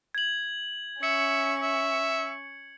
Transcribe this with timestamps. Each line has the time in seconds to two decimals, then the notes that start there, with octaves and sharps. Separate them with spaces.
0.15 G#6 F#7
1.03 C#4 E5 C#6 C#7
1.62 E5